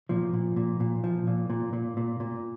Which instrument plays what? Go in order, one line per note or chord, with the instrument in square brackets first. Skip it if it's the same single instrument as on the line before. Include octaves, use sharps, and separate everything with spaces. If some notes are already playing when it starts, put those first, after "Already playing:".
[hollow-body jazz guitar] A#2 F3
A#2
A#2
A#2
F3
A#2
A#2
A#2
A#2
A#2